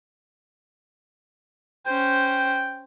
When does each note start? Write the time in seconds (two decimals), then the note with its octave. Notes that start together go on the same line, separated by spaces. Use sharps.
1.87 C#4 C5 G5